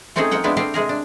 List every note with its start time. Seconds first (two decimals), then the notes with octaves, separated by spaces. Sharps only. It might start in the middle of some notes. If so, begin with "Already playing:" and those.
0.16 A3 C4 C#4 D#4 G#4 A4
0.31 F3 A#3 F#5 G5
0.44 G#3 B3 D4 E4 G4
0.57 A3 C4 G4 G#4 E5 F5
0.74 C3 G#3 G#4 A#4
0.89 D4